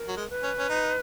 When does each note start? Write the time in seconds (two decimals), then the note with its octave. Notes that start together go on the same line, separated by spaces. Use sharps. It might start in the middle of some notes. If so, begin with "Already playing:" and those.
Already playing: A#4
0.08 F#3
0.17 G#3
0.30 B4
0.43 C#4
0.59 C#4
0.69 D#4